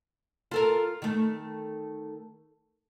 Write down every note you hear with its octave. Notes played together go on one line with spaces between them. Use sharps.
F4 A4 A#4
D#3 A3